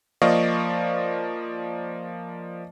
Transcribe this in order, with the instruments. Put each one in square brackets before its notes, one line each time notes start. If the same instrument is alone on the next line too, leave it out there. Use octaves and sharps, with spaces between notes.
[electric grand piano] F3 A#3 D5 D#5 F5 C#6